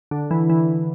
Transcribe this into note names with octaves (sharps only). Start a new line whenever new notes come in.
D3
E3
E3